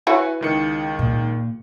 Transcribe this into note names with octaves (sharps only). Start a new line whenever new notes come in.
E4 F#4 B4 C#5 G#5
C#2 D#3 C#7
A#2